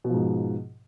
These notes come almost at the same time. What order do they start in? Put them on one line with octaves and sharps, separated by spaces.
B2 F3 G#2